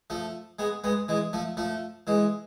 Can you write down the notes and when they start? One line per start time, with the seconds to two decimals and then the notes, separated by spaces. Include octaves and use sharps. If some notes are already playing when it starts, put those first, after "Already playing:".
0.10 F3 A3
0.59 G#3 B3
0.84 G#3 B3
1.08 E3 G#3
1.33 F3 A3
1.57 F3 A3
2.07 E3 G#3